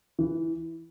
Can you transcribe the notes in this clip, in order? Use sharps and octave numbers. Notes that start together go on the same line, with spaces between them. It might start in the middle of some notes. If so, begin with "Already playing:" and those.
E3